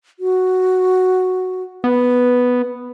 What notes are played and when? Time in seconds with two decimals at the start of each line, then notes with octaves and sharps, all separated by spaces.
0.19 F#4
1.84 B3 B4